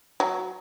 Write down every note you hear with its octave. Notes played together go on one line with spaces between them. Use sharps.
F#3